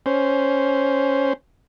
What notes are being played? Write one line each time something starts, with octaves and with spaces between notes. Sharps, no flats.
C#4 C5